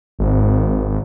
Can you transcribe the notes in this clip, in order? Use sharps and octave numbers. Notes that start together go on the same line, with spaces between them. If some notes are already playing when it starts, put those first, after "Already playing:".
G#1